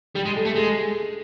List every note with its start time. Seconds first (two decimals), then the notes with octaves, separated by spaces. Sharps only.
0.15 G3 G4
0.25 G#3
0.36 A4
0.45 A3
0.55 G#3 G#4